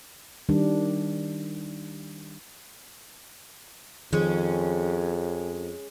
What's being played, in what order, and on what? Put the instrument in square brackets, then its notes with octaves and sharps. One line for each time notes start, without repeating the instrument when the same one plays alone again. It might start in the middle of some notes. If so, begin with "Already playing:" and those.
[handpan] D#3 G3 D4
[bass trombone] F2 [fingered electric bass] D#3 F3 [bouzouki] G#3 C#4